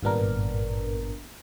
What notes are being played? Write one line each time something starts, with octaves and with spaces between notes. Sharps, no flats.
G#1 G2 A#2 B3 D4 A#4